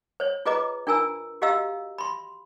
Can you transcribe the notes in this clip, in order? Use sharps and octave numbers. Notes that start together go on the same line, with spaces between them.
C5 C#5
F4 G#4 B4 D#5 A#5 D6
D4 F4 A#4 G#5 A#5 E6
F#4 G4 D#5 F5 A#5 E6
B5 C6